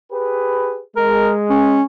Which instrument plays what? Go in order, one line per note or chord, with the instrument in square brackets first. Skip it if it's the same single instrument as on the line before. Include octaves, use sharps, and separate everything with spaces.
[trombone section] G4 G#4 B4
[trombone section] G#3 [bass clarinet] A#4
[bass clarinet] C#4